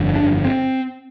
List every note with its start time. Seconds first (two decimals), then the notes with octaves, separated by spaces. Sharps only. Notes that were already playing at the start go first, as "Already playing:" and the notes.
Already playing: G1 F2 D3
0.16 D4
0.45 C4